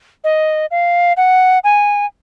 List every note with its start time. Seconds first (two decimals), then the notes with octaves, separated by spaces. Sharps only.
0.24 D#5
0.71 F5
1.17 F#5
1.64 G#5